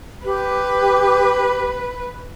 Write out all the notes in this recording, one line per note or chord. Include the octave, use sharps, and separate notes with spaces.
G4 B4